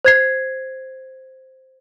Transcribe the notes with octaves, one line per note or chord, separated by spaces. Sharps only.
C5 G#6 C7